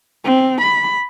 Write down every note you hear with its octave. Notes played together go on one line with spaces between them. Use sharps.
C4
B5